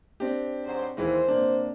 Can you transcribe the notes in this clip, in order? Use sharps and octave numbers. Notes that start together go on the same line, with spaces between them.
C4 D4 G4
G#2 F#3 C5
D#2 E3 G#3 C5
C3 A#3 D4